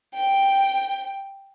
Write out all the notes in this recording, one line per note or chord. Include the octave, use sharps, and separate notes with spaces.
G5